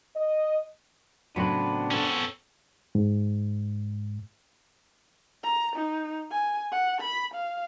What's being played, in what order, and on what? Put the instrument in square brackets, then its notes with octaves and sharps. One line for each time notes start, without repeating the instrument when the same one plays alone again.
[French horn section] D#5
[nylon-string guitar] A2 C#3 F#3 [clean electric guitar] B3 C4 B4 [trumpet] D4
[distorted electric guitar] C#4 A4
[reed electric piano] G#2
[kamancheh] A#5
D#4
G#5
F#5
B5
F5